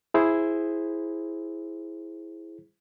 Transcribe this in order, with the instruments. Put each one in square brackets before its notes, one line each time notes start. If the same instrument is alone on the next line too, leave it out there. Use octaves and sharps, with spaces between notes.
[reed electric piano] E4 G#4 C5